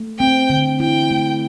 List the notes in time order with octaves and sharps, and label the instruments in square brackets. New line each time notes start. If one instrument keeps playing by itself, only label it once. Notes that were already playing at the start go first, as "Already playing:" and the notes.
Already playing: [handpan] A3
[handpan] C4 [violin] G5
[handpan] D3
[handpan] E4 [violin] G5
[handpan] A3